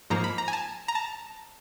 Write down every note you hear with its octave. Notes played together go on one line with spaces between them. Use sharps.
G#2 F3 A#3 A#5
B5
A#5
G#5
A5
A#5
A5